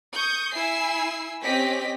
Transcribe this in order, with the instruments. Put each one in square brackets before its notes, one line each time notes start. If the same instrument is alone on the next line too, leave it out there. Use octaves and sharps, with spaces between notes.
[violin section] C#6 D#6 G6
E4 G#5 E6 C7
C4 C#4 G4 D#5 B6